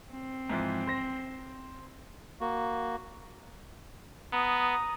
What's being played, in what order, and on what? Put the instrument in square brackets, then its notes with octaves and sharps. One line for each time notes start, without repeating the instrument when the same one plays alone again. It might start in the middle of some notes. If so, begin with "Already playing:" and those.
[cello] C4
[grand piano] G#2 E3 F3
C5 A#6
[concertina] A#3 F#4
[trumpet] B3 [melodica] A#5 D#6